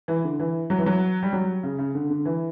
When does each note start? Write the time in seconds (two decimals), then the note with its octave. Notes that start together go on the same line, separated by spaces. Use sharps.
0.08 E3
0.24 D3
0.40 E3
0.70 F#3
0.78 E3
0.86 F#3
1.23 G3
1.33 F#3
1.63 C#3
1.79 C#3
1.95 D3
2.10 D3
2.25 E3